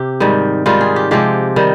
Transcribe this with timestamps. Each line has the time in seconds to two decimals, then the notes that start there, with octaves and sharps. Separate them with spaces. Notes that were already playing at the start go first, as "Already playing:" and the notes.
Already playing: C3 G4
0.20 G#2 D#3 G3
0.66 G#2 D#3 G3 F4
0.81 G#4
0.96 G4
1.11 C3 F3 G#3 G4
1.56 D#3 G3